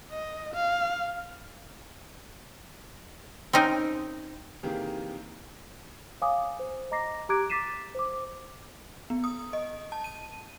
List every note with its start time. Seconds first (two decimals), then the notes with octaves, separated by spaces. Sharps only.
0.12 D#5
0.54 F5
3.53 C4 C#4 D#4 A#4
4.63 C3 D#3 E3 A#3 G4 G#4
6.21 C#5 F5 G#5 D6 D#6
6.60 C5
6.91 D#5 A#5 D6 A#6 C7
7.29 G4 A#5 D6 F#6 G#6 D7
7.50 D6 A6 B6 C7 D#7 E7
7.95 C5 D6
9.10 B3
9.24 D#6
9.53 D#5
9.92 A5
10.04 D#7